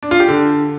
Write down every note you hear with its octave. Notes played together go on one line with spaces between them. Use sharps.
D4
F4
G4
D3